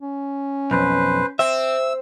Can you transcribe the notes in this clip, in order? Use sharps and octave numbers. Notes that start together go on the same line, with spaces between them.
C#4
B1 F2 B4 C5
C4 E5 E6